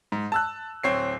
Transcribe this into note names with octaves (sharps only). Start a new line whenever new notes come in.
G#2
A5 E6 F#6
D1 C4 C#5 C7